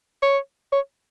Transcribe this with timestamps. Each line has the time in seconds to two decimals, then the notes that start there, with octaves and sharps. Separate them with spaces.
0.23 C#5
0.72 C#5